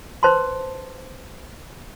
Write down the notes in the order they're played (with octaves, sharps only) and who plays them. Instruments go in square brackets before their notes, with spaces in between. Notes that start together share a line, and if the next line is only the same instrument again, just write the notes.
[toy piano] B4 C5 A5 C6